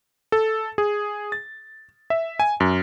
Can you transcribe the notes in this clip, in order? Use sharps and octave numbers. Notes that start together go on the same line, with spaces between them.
A4
G#4
A6
E5
G#5
F#2